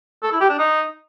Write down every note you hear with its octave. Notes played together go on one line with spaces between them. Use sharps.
A4
E4
G4
D4
D#4